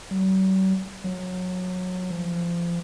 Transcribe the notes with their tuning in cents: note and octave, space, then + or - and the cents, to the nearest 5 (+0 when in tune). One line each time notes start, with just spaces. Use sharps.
F#3 +45
F#3 -20
F3 -25